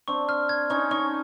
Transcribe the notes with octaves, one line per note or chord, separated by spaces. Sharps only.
C4 D4 C#6
F6
G#6
C#4 D#4 C#6
C#4 D#4 C#6